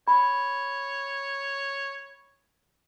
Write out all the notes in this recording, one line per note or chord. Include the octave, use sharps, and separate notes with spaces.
C#5 B5